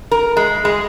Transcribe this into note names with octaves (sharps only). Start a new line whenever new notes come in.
A#4
G#3
G#3